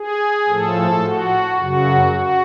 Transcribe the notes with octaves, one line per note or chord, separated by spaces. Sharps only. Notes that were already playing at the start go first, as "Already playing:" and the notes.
Already playing: G#4
A2 F3 A4
F#4
F#2 C#3 F#3 F#4
F#4